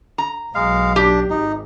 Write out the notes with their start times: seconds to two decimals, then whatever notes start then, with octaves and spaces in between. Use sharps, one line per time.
0.18 A#5
0.55 B1 G#3 F5
0.96 D4 G4
1.30 G#1 D#4